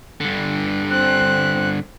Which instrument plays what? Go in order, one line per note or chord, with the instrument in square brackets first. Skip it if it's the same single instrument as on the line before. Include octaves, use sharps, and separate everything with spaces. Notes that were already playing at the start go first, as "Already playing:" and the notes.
[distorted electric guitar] G2 D3
[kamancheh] C4 [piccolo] F#6